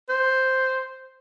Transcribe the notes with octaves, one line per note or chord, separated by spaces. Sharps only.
C5